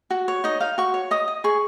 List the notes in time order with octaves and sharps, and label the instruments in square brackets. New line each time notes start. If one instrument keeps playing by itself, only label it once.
[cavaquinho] F#4
C#5
D#4 D#5
D#4 F5
F#4 C#6
C#5
D#5 D#6
D#5
G#4 C#6